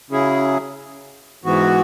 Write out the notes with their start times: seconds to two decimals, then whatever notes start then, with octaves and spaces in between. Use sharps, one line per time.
0.10 C#3 F#3 C#4 E4 G#4
1.44 G#2 E3 B3 F#4